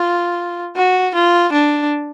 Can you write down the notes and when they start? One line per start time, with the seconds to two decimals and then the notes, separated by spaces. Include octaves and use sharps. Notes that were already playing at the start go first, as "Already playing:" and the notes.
Already playing: F4
0.77 F#4
1.15 F4
1.52 D4